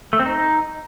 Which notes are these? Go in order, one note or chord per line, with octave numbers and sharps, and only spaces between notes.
A3
C4
D#4